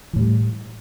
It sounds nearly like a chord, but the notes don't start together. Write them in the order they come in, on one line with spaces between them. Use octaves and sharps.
E3 A2 G3